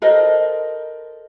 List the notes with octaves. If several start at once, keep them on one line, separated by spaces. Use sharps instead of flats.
A4 A#4 C5 D#5